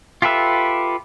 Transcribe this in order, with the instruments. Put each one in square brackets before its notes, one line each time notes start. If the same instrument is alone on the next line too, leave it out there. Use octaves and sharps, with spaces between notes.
[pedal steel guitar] F4 G4 A4 B4 E5